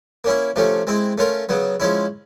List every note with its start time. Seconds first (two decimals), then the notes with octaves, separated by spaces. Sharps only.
0.24 A#3 C#4 E4
0.56 C3 F3 A3 C#4
0.87 G#3 C4 E4
1.18 A3 C#4 F4 A#4
1.49 C#3 F#3 B3
1.80 F3 G#3 C#4 E4